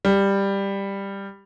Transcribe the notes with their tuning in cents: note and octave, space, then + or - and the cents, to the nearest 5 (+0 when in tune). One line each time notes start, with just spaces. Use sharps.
G3 +10